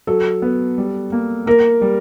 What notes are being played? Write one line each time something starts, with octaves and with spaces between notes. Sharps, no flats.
F#3 A4
B3
G3
A#3
A#3 A#4
G3